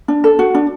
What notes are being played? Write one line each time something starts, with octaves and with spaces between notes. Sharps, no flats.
D4
A4
F#4
D4